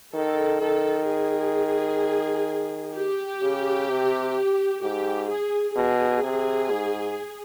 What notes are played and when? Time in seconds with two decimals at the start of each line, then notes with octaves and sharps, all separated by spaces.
0.14 D#3 A4
0.61 D#3 A4
1.08 G#4
2.95 G4
3.42 C#3
3.89 C3
4.83 G#2 G4
5.29 G#4
5.76 B2 G#4
6.23 C3
6.71 G#2